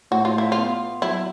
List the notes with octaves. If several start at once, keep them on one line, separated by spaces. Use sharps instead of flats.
A2 F#4
F4
E4
F4
B3
F#3 E4